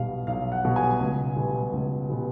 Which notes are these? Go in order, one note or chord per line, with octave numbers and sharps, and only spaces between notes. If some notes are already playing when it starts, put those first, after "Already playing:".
Already playing: B1 B2 G3 F5
B1 F5
F#5
B2 G3
G#5
C#2
B2 G3 B3
C#2
B2 G3 B3